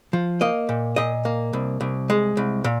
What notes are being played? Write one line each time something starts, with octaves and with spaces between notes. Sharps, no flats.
F3
A#3 D#5
A#2
A#2 D#5
A#3
C2
C2
G#3
C2
A#2